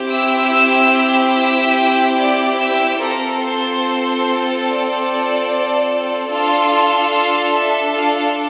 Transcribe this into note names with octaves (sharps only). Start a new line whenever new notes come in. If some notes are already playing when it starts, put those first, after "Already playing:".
Already playing: C4 E4 G4
E5 E6
E5 E6
E5 E6
D5 D6
E5 E6
C4 F4 A4 A#4 A#5
C5 C6
D5
D4 F4 A4
F4 F5
E5
F4 F5